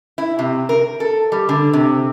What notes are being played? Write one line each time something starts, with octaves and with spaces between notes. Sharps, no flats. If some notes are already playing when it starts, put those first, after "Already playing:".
E4
C3
A#4
A4
G3
D3
C3